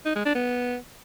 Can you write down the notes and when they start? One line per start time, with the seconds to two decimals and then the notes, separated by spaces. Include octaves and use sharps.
0.06 D#4
0.16 G#3
0.25 D4
0.35 B3